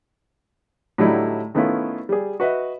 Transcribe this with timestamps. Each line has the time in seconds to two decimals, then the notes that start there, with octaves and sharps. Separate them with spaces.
0.98 A2 D3 F#3 G3 D#4 E4
1.55 D#3 A3 B3 C#4 E4 F4
2.09 G3 G#4
2.40 F#4 B4 D#5 E5